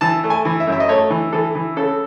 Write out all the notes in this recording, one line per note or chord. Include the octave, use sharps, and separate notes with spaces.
E3 A5
A3
G#5
E3
E5
F#2
E5
D#5
A3 C#5
E3
E3 A4
E3
C#3 A4